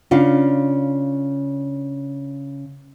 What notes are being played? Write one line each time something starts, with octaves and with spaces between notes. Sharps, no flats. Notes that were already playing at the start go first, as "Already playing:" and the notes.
C#3 D4 F4